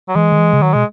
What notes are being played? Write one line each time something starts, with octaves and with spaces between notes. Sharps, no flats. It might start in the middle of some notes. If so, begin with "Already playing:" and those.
F#3
E3 G#3
D#3
E3
C#3
D#3 F#3
B2 G#3